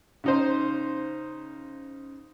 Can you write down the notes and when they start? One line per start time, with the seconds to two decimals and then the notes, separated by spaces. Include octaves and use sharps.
0.24 C#3 D#4 C5